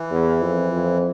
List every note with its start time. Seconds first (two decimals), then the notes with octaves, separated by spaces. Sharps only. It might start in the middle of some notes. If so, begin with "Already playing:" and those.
Already playing: E3
0.11 E2
0.41 F2
0.72 F2